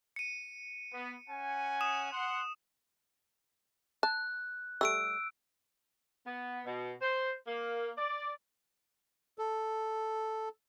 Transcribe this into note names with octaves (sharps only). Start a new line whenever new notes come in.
C#7 D#7
B3
C#4 F#5 G#5
D#6 E7
F#5 C6
A5 F#6
G3 A3 E6 D7
B3
B2
C5
A#3
D5
A4